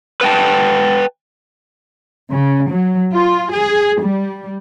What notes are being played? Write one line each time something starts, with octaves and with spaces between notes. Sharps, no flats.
B4 F#5 G5 A5
C#3
F#3
F4
G#4
G3